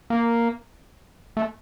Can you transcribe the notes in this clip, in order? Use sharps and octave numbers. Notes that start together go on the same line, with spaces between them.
A#3
A3